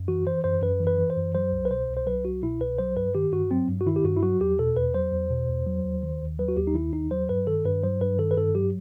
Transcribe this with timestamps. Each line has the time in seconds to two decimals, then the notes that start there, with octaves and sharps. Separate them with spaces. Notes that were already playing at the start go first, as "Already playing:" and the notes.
Already playing: F#2
0.08 E3 F#4
0.27 E3 C5
0.44 F#2 C5
0.62 F#2 B4
0.80 E3
0.87 B4
0.99 E3
1.10 C5
1.17 F#2
1.35 F#3 C5
1.52 C2
1.65 B4
1.70 B2 C5
1.89 C2
1.97 C5
2.06 F#3 B4
2.24 C2 F#4
2.43 B2 E4
2.61 C2 B4
2.79 F#3 C5
2.96 G2 B4
3.15 D#3 G4
3.32 G2 F#4
3.51 F#3 C4
3.69 G2
3.81 F#4
3.86 D#3 E4
3.96 G4
4.05 G2 F#4
4.17 E4
4.23 F#3 F#4
4.41 E2 G4
4.59 B2 A4
4.77 E2 B4
4.95 F#3 C5
5.12 E2
5.31 B2
5.48 E2
5.67 F#3
5.84 D#2
6.03 D#3
6.21 D#2
6.39 F#3 B4
6.48 F#4
6.57 D#2 G4
6.67 D#4
6.74 D#3 E4
6.93 D#2 D#4
7.11 F#3 C5
7.29 G2 B4
7.47 D#3 A4
7.65 G2 B4
7.83 F#3 C5
8.01 G2 B4
8.18 D#3 A4
8.31 B4
8.36 G2 A4
8.55 F#3 G4